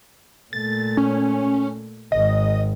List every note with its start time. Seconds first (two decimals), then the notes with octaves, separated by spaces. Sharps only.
0.53 A#2 A3 A6
0.97 C#4
2.12 G#1 D#5